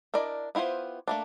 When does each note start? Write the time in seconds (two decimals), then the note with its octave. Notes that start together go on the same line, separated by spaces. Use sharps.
0.14 D4 E4 A#4 D5 D#5
0.55 B3 E4 F4 G4 C5
1.08 A3 A#3 D4